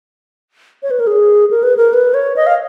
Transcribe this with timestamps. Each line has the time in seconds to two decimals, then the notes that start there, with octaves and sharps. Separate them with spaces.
0.83 C#5
0.91 B4
1.00 A#4
1.07 G#4
1.51 A#4
1.63 B4
1.77 A#4
1.93 B4
2.14 C#5
2.36 D#5
2.47 F5